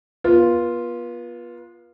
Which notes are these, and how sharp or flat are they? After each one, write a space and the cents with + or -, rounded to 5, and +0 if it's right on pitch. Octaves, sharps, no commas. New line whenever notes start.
B3 -35 F4 +0